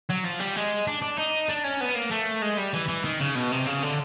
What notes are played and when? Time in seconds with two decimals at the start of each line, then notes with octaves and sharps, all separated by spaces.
0.10 F#3
0.24 F3
0.39 G3
0.56 G#3
0.87 D4
1.02 D4
1.18 D#4
1.49 D4
1.64 C#4
1.81 B3
1.95 A#3
2.11 A3
2.42 G#3
2.58 G3
2.74 E3
2.88 E3
3.04 D#3
3.20 C#3
3.35 B2
3.52 C3
3.66 C#3
3.83 D3